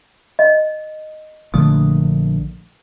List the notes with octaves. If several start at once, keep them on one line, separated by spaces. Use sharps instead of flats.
D#5
A#1 D3 A3 D#6